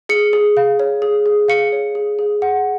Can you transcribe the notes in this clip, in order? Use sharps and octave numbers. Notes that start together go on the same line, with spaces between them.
G#4 C#7
G#4
F5
C#5
G#4
G#4
F5 C#7
C#5
G#4
G#4
F#5